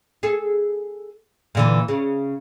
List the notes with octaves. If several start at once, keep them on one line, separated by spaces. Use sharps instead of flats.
G#4 A4
A#2 D3 E3
C#3